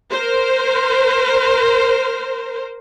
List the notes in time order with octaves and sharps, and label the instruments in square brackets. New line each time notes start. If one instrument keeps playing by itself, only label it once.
[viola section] A#4 C5